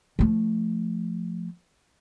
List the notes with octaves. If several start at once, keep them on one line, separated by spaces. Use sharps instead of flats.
F3 A3